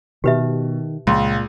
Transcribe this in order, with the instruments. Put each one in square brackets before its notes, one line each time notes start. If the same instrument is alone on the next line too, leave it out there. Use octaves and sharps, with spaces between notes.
[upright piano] B2 [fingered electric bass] D#3 [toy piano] G4 B4 E5
[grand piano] C#2 [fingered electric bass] A#2 [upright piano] C6